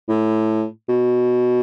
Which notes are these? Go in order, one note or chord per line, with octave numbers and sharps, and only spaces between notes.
A2
B2